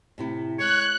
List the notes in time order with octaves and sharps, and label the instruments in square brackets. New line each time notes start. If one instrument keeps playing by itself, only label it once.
[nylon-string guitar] A2 C3 E4
[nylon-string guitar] G#3 [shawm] C#5 [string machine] F#6